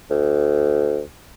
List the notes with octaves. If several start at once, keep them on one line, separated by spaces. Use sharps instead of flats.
D2